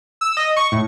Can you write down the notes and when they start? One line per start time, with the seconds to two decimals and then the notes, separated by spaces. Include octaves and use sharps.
0.21 E6
0.37 D#5
0.56 C#6
0.72 A2